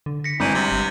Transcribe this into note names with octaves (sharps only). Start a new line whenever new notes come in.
D3
A#6 B6 C#7
G#1 E3 C4 D4 A#5 B5 G6 D#7
C3 G3
G1